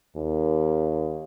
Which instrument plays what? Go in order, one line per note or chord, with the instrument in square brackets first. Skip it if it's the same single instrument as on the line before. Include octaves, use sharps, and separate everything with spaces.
[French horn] D#2